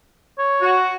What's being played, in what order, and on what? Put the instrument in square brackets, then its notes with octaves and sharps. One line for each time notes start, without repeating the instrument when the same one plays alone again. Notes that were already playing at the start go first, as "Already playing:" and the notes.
[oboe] C#5
[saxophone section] F#4